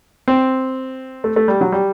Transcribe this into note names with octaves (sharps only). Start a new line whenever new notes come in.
C4
A3
A3
G3
F#3
G3